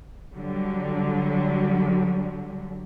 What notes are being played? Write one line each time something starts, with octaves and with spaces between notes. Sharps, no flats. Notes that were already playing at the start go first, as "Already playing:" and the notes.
D3 F#3 G3